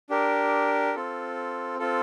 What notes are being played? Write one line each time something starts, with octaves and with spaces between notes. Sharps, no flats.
D4 G4 A#4
C4 F4 A4
C4 F4 A4